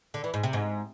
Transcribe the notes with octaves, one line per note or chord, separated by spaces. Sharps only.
D3
E3
G#2
C3
G#2